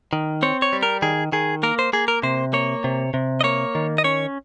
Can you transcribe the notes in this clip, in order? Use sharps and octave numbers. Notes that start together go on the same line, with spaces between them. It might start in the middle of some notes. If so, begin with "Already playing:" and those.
D#3
C4 C#5
C#5
G3
A#4
D#3 G#4
D#3 G#4
A#3 A#4
C5
A#3 G#4
A#4
C3 C5
A#3 C#5
C3
C3
D#5
A#3 C#5
D#3
D#5
C#4 C#5